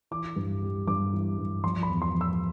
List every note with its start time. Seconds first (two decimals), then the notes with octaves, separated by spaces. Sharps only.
0.11 E3 D6
0.36 G2
0.62 G3
0.87 G2 D6
1.13 E3
1.39 G2
1.64 F3 C6
1.83 B5
1.89 E2
2.02 C6
2.14 F3
2.21 E6